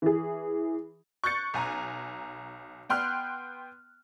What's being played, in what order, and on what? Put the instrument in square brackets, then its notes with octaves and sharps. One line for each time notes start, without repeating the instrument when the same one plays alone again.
[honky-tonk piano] E3 G#4
C#6 F#6 G6 A6 C#7
B1 G#5 A#5
B3 G5 C6 F6 F#6